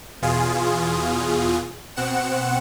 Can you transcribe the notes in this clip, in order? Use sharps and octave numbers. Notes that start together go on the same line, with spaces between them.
E2 B2 F4 G#4
B2 C4 F#5 C#7 E7